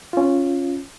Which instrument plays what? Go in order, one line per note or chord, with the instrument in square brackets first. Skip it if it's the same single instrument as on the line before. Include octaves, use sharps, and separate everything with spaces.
[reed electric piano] C#4 F4